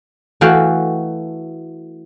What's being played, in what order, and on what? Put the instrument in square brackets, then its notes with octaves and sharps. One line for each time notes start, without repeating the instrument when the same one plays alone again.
[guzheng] E3 A3 F#4 F5 G5